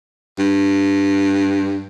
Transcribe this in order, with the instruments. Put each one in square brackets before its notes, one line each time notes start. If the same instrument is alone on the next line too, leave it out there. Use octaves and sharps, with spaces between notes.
[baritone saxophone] G2